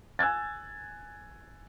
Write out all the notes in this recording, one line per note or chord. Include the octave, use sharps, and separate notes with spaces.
G#5 E6 F#6 G#6 A6